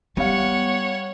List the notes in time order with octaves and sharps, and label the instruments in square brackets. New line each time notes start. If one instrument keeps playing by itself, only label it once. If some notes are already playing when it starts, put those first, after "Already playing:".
[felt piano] G3 F5 [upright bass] B3 [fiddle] C#5 F#5